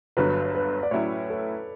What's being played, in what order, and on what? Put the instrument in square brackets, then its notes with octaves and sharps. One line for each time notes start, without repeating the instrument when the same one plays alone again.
[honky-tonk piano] G1 G2 D3 F#3 [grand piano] B4
[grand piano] B4
D5
[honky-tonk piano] A2 F#3 C#4 E4 [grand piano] C#5
[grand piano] A4